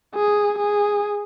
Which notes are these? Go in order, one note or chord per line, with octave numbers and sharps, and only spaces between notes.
G#4
G#4